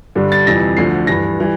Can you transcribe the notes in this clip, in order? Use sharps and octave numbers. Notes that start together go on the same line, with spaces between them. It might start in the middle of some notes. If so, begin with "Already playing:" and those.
G2 D3 G3
A6
F2 C3 E3 G3 A#6
D2 D3 F3 C7
G2 E3 G3 A#6
E3 G3